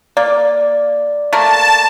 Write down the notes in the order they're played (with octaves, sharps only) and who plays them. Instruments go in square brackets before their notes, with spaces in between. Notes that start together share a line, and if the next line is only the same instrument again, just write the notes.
[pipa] A#3 [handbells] D5
[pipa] A3 A#3 A#4 [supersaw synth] A5